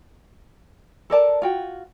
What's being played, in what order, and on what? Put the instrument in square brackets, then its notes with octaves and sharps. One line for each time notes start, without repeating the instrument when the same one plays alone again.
[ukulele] A4 A#4 D5 A5
F4 F#4 G5